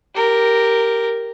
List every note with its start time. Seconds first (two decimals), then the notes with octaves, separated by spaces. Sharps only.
0.15 G4 A#4